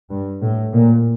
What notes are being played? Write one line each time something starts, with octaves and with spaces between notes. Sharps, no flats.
G2
A2
A#2